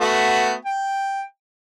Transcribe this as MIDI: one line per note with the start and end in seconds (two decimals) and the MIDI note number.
0.01 0.54 57
0.01 0.54 59
0.01 0.54 66
0.65 1.23 79